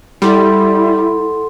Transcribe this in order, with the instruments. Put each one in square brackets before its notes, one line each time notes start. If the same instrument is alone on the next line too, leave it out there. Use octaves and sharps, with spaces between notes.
[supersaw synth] G3 [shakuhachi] E4 [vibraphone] A4 F#5 C6